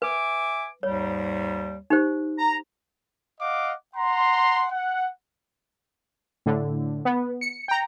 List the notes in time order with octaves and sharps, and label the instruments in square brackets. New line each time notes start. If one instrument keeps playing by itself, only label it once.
[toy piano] B4 [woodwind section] E5 G#5 D6
[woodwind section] D#2 G#2 G3 [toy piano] C#5
[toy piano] D#4 G4 C5
[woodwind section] A#5
[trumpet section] D#5 F5 F#5 D6
F#5 A#5 C6
F#5
[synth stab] A2 D3
B3
C#7
G5 A#5